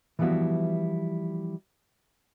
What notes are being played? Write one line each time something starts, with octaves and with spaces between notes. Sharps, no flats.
E3 F3 G3 B3 E4 F#4